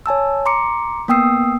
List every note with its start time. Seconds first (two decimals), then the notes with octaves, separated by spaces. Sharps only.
0.06 C#5 G#5 A5 E6
0.46 A#5 C6 D6 C#7
1.08 A#3 B3 G5 D#6 E6 C7